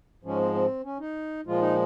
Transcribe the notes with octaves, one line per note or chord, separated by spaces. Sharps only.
G#2 F3 G#3 C#4
C4
C4
C#4
D#4
A#2 F3 G#3 F4
D#4